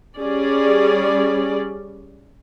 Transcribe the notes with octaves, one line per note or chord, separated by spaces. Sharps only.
G3 C#4 G#4 D5